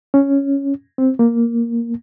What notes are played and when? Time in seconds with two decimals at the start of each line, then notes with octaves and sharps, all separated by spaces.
0.14 C#4
0.98 C4
1.19 A#3